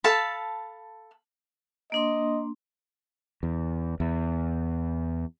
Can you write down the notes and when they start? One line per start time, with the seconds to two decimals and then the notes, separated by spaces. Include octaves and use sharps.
0.04 A4 F5 A5 B5
1.92 A#3 D4 D#5 C6
3.43 E2
4.00 E2